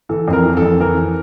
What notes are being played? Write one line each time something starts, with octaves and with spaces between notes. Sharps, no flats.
E3 A4
F2
A#4
E3
A4
F2
E3 A#4